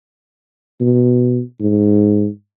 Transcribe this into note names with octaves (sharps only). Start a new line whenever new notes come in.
B2
G#2